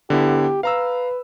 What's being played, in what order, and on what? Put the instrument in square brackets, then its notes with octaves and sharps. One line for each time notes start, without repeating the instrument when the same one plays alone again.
[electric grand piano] D3 B3 E4 [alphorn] G4
[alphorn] B4 [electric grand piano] F5 A#5 E6